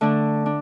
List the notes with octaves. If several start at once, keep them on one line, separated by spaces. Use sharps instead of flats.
D3 A3 D4
D4